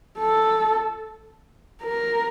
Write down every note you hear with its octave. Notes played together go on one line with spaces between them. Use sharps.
A4
A#4